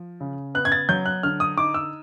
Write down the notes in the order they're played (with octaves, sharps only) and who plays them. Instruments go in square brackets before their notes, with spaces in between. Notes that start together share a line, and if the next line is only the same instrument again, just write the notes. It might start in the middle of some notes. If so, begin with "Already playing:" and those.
Already playing: [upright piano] F3
C#3
B3 F#6
G#6
A6
F#3 G6
F#6
D3 F6
D#6
D#4 D6
E6